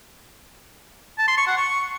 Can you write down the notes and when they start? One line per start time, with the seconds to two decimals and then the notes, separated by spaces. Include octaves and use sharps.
1.18 A5
1.28 C6
1.38 C#6
1.48 F#5
1.57 C#6